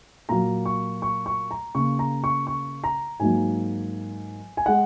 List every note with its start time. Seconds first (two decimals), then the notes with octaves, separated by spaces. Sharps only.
0.29 A#2 F#3 A#3 A#5
0.65 C#6
1.02 C#6
1.26 C#6
1.51 A#5
1.75 C#3 A#3 C#6
1.99 A#5
2.24 C#6
2.47 C#6
2.84 A#5
3.20 G#2 F#3 A#3 G#5
4.57 G#5
4.66 G#3 F#5